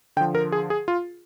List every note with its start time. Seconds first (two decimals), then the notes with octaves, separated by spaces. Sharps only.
0.17 D3 G5
0.21 F3
0.35 A#4
0.52 G#4
0.70 G#4
0.88 F4